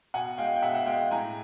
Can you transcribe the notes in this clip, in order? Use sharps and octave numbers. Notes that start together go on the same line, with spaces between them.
B2 F#5 G#5
G#3 F5 G5
G5
B2 E5 F#5
E5 F#5
G#3 F5 G5
A2 G#5 A#5